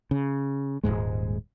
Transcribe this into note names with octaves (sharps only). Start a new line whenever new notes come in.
C#3
D#1 C2 G#2 G#3